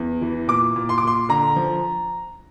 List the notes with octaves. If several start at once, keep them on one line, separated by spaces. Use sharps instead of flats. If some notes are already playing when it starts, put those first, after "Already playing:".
Already playing: E2
E3
A#2 D6
A#2
C6
D6
A#2 C6
D3 A#5
F3